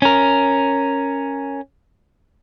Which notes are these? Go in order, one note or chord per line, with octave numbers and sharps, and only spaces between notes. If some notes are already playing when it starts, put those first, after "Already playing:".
C#4 A#4